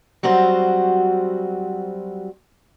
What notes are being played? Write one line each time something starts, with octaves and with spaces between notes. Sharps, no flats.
F#3 G3 C4 F#4 C5